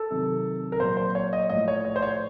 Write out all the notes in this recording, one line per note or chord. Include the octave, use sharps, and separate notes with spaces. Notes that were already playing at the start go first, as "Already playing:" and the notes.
Already playing: A4
C3 D#3 F#3
A#4
A#2 F#3 C5
C5
C#5
D#5
A2 F3 D#5
C#5
C#5
C5
C#5